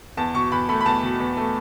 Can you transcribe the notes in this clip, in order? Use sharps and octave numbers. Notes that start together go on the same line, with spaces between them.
E2 A5
B2 C#6
E2 B5
A3 B5
B5
E2 A5
B2
E2
A3